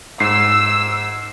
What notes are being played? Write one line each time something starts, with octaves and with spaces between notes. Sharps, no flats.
G#2 E6 C7